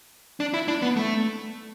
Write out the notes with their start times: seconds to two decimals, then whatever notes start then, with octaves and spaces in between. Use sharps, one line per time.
0.40 D4
0.54 E4
0.68 D4
0.82 B3
0.97 A3